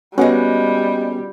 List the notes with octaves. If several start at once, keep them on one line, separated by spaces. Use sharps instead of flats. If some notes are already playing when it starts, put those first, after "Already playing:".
G3 G#3 A#3 B3 C#4 F4 F#4 F#5